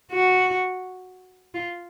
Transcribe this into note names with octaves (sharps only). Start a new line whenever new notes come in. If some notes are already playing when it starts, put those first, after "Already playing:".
F#4
F4